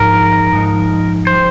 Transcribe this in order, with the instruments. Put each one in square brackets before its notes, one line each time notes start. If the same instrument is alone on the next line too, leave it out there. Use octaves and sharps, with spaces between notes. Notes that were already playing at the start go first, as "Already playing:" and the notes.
Already playing: [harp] G#2 F3 G#3 D#4 [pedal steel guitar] A#4
[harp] G#2 F3 G#3 D#4
[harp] G3 [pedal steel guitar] C5